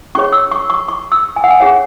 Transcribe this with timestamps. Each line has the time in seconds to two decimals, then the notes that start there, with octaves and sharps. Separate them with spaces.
0.15 C#4 G#4 C#5 C#6
0.32 E6
0.51 C#6
0.70 C#6
0.88 C#6
1.12 E6
1.36 G#5
1.44 F#5
1.50 G#5
1.60 C#4 G#4 C#5 F#5